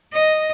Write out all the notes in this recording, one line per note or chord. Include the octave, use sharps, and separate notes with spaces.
D#5